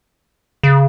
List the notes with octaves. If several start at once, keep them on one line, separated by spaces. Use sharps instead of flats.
C#3